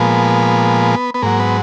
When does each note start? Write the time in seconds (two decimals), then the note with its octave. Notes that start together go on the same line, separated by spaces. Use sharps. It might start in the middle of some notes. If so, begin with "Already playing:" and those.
Already playing: A#2 F3 G#3 B3
1.14 B3
1.22 G#2 F#3 A#3
1.39 B3